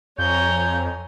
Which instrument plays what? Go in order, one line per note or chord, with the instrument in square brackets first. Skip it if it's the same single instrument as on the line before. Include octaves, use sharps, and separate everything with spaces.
[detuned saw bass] F2 [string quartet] C#5 G#5 A#5 [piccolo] G6